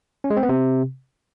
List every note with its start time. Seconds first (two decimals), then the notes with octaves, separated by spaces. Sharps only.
0.24 C#4
0.30 G#3
0.37 C4
0.43 B3
0.49 C3